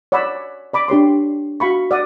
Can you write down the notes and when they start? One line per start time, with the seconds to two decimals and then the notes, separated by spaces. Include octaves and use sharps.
0.12 C#5 D5 F#5 B5 E6
0.73 D5 B5 D6
0.88 D4 G4 C#5 C6
1.60 F#4 F5 B5 C#6
1.91 D5 F#5 D#6